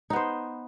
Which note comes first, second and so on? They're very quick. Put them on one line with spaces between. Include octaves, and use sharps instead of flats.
D#4 B3 C5